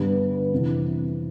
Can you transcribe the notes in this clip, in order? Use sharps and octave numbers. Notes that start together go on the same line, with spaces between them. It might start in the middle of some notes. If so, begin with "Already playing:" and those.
Already playing: G2 D3 G3 B3 D4
F2 C3 E3